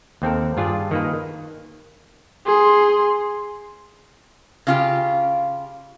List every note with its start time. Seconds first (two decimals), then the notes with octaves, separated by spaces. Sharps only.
0.22 D#2 C4 A4 A#4
0.57 G2 D4 F4 G#4 D5
0.91 D#3 A#3 B4
2.46 G#4 C6
4.67 C#3 F4 G4